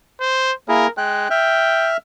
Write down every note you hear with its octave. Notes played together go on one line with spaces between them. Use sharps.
C5
A#3 E4 G#4 A#4
G#3 G5 F#6
E5 G5 F6